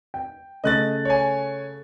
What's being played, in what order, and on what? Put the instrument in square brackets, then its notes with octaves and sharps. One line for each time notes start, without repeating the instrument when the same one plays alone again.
[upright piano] G5
[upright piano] C#3 A3 [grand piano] D#5 F#6 A6
[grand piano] C#5 G#5